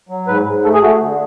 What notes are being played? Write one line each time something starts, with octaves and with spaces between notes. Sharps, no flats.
F#3
G#2 B4
G#2
A3 A4
G#4
A3 F#4
D3